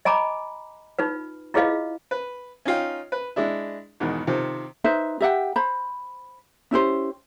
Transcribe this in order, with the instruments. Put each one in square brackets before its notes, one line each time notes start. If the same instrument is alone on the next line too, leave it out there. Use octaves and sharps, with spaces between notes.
[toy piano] D#5 G#5 A#5 B5 D6
D#4 F4 B4
E4 F4 G#4 B4 D#5 F5
[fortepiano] B4
C#4 D#4 F4 G5
B4
G#3 D4 E4
E2 G#2 B2 D#3
C3 D#3 F3
[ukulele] D#4 B4 C5 E5
G4 E5 F#5 G5
C5 B5
C#4 E4 G4 C5